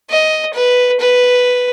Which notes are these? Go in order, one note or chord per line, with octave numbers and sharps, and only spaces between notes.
D#5
B4
B4